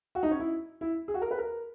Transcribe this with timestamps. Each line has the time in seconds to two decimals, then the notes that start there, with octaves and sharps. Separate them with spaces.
0.15 F#4
0.23 D#4
0.31 C#4
0.40 E4
0.81 E4
1.08 G#4
1.14 F#4
1.22 A#4
1.31 B4
1.38 A#4